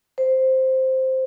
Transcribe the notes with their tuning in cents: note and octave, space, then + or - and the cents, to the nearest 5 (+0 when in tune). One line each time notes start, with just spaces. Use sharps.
C5 +0